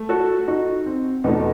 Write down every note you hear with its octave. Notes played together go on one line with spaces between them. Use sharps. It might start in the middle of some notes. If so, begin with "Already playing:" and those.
Already playing: A3
F#4 A4
D#4 F#4
C4
E2 B2 A3 B3 D#4